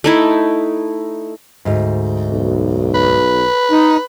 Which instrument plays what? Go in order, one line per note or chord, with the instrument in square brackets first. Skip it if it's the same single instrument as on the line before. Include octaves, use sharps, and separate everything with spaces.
[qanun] A3 D#4 E4
[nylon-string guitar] D2 G#2
[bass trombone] B1
[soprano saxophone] B4
[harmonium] D#4